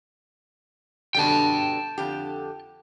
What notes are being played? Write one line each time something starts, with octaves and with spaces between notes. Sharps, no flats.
B2 D3 G3 G5 A5
F2 D3 G4